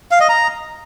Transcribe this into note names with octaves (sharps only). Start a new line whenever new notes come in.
F5
D#5
A#5